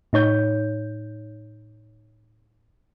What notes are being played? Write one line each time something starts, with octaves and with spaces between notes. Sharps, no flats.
A2 D#4 C#5 G6